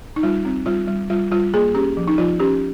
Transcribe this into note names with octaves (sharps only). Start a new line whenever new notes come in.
D#4
G3 F4
C4
G3 F4
G3
G3 F4
G3 F4
A#3 G#4
C#4 G4
F3
D#4
F3 F4
C#4 G4